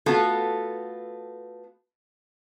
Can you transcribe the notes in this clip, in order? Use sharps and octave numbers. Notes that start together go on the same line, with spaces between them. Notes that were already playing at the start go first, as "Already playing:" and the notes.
A3 B3 F4 F#4 A4